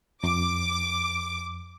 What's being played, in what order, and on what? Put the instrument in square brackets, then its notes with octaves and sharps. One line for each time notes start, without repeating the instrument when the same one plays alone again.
[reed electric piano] F2 [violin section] D6